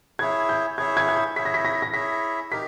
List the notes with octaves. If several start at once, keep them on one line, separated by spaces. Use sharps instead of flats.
E4 G#4 C#5 E5 G#6
G6
E4 G#4 C#5 E5 G#6
G#6
G#6
G6
E4 G#4 C#5 E5 B6
A#6
B6
A#6
A#6
E4 G#4 C#5 E5 B6
D#4 G4 A#4 B6